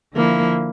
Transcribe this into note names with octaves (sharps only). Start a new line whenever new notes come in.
D3 F3 A#3 E4